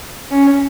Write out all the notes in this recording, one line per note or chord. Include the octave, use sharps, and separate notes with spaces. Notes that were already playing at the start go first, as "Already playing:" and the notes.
C#4